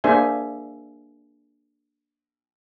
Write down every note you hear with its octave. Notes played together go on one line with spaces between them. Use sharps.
A#3 D4 G#4 C5 E5 G#5